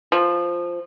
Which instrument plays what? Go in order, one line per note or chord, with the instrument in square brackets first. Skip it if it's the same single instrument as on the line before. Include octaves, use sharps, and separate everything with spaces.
[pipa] F3